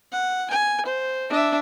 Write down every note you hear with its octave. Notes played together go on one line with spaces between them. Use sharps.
F#5
G#5
C5
D4 E5